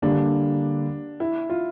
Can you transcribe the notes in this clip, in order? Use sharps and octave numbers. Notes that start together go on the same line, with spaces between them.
D3 G3 A#3 D4
E4
F4